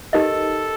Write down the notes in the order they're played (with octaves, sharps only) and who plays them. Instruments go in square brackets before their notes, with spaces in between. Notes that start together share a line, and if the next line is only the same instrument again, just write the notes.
[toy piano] D#4 G4 A#4 D#5 [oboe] A4